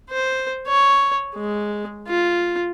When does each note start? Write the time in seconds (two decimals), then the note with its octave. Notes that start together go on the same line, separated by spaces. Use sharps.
0.10 C5
0.67 C#5
1.35 G#3
2.08 F4